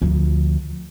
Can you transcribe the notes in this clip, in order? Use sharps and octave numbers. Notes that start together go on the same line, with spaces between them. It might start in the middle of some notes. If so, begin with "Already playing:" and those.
D2 F3